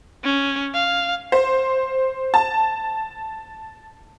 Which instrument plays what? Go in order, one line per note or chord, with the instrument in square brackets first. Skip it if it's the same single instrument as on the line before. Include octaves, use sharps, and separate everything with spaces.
[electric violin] C#4
F5
[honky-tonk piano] C5
A5